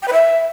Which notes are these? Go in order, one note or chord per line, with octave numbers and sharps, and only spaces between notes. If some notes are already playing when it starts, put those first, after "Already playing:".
G5
B4
E5